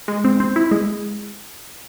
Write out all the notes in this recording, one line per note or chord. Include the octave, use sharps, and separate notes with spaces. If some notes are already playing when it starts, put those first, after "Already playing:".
G#3
C4
C4
E4
G#3